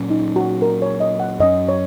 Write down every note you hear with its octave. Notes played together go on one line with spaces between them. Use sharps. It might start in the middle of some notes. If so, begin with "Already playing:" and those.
Already playing: A#2 F#3 C#4
D#4
F#4
A#4
C#5
D#5
F#5
F#2 F#3 C#4 D#5
C#5